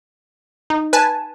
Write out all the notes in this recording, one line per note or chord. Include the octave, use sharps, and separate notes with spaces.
D#4
B4 G#5 A5